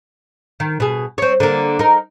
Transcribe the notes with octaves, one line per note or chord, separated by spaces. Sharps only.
D#3
B2 G#4
C4 C#5
D3 A#3
D#4 A#4